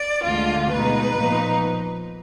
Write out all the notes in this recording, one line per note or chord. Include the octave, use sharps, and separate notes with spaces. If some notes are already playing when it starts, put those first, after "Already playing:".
Already playing: D5
D2 D3 G#3 F4
B2 G#3 D#4 B4
A#2 F3 B3 D#4